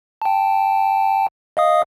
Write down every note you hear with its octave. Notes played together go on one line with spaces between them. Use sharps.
G5 A5
D#5 F5 D#6